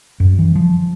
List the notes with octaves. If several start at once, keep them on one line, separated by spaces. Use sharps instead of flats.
F#2
E3
F3